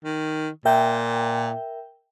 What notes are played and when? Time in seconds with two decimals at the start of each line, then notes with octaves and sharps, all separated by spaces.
0.04 D#3
0.65 A#2 A#4 E5 G5